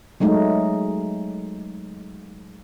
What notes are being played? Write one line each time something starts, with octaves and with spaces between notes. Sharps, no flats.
F#3 G#3 A3 D#4